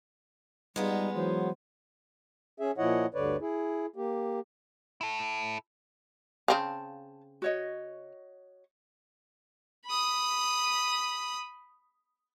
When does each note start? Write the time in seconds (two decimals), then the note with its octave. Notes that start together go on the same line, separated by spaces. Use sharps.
0.76 G3 G#3 B3 D#4 F4
1.16 E3 F#3 C5
2.60 C#4 G#4 E5
2.78 A#2 F3 E4 C#5 D#5 F#5
3.14 D2 G2 D3 B4 C#5 D5
3.41 E4 G#4
3.96 A#3 G4
5.01 E4 A4
6.48 C#3 C4 F5 A5
7.42 F#4 C#5 D#5
9.86 B5 D#6